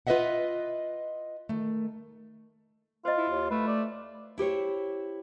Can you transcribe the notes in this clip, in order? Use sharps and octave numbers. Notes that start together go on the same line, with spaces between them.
F4 B4 C5 D#5 E5 F#5
D#3 A3
F4 C5 D#5
E4
D#2
A3 B4
D5
E4 G4 C5 C#5